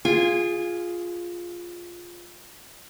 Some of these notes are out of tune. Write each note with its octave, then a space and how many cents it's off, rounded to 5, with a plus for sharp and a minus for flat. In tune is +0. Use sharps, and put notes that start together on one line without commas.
F4 +0 G#4 +0 G#5 -30